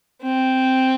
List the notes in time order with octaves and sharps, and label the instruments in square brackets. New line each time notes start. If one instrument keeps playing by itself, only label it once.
[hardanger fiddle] C4